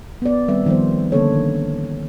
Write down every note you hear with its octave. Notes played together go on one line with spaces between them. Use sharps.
B3 D5
D#3 G3 C4 B4 E5
D#3 F3 G3 B3 C5
D3 A#3 C#4 A4 C#5
D#3